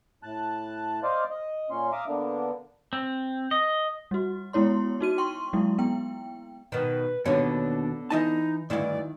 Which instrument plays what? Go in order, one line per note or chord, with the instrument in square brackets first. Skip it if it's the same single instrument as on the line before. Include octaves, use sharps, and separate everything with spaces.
[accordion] A2 A5 F#6
C5 D5 D#5 F5
D#5
A#2 C#4 C6
E5 F5 A#5 D6 D#6
D3 A#3 B3 D4
[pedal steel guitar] C4
D#5
[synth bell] G3 F#4
G#3 B3 E4 C#5 C6
D#4 F#4 D#7
G5 C6 C#6
F#3 G#3 A#3 E4
B3 G5
[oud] B2 D#3 [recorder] B4
[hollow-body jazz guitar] D#2 B2 [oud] D3 B3 C#5 [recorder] D4
[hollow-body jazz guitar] E3 D#5 A5 [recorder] D#4
[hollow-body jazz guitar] D2 G2 [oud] D#3 E4 [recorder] D5